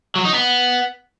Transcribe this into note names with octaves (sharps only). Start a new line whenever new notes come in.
F#3
D#4
B3